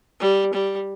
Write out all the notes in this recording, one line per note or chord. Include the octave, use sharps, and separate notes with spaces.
G3
G3